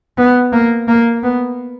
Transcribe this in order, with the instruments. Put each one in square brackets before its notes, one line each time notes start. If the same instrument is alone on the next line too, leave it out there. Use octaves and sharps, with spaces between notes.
[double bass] B3
A#3
A#3
B3